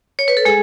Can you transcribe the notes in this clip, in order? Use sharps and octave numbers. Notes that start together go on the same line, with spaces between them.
C#5
B4
A4
G#3 G#4